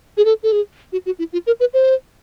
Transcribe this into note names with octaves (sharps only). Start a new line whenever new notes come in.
G#4
A4
A4
G#4
F#4
F#4
E4
F4
A#4
B4
C5